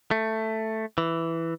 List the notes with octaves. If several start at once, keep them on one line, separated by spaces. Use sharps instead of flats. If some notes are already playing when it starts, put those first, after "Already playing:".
A3
E3